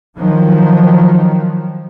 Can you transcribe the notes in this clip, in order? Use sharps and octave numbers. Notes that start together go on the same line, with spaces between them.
D#3 F3 F#3